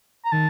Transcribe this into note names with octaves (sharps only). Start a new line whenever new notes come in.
A#5
D#3 A5